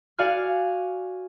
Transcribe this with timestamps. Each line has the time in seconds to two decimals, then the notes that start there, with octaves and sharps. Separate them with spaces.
0.18 F#4 D5 F5 G#5 F6